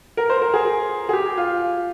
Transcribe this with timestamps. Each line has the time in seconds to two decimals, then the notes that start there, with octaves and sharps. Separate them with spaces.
0.17 A#4
0.30 C5
0.42 A#4
0.54 G#4
1.09 G#4
1.13 G4
1.37 F4